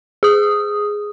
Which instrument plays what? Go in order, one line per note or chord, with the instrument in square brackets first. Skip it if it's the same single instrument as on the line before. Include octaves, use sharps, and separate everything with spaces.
[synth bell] G#4 D#6